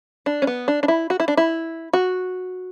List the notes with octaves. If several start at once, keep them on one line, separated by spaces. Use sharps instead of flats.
D4
C#4
B3
D4
D4
E4
F#4
E4
D4
E4
F#4